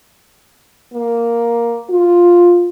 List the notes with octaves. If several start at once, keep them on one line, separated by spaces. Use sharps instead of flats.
A#3
F4